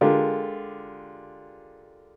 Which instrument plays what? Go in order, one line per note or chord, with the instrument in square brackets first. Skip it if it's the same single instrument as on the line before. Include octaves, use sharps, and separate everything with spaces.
[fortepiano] D3 G#3 F4 G4 A#4